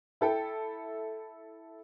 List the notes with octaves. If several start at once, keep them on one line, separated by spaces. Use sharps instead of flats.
E4 A4 G5